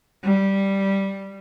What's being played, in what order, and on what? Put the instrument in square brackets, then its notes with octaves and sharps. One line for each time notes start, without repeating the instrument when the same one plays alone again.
[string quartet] G3